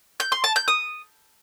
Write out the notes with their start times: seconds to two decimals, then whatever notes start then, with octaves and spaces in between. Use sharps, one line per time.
0.20 G6
0.32 C6
0.44 A5
0.56 G6
0.68 D#6